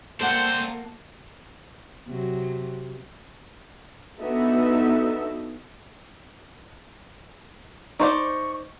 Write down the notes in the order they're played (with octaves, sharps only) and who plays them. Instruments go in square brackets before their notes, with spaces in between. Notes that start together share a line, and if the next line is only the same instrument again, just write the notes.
[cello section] A#3 [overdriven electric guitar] C4 D5 [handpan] A4 F#5 [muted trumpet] C5
[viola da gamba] C3 F#3
[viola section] B3 D4 D#4 F#4 A4 E5
[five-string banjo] D#4 C5 D5 [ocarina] C#6